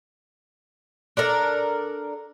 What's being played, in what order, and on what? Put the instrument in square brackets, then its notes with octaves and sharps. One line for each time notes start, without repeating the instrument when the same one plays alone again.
[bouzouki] D4 A4 A#4 D5